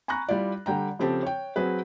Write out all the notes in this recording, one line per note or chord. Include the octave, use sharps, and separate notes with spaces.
G#5 A#5 B5 C#6 F#6 A#6
G3 E4 F4 D5
D3 G3 G5 A#5
C#3 F3 C4 G4 A4 A5
C#5 G5
F#3 C4 G#4 B4